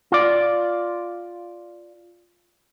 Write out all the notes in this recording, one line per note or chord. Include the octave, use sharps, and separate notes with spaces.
F4 D5